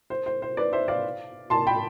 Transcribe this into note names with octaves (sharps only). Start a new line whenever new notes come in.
C5
C5
C5
B4 D5
C5 E5
D5 F5
A5 C6
G5 B5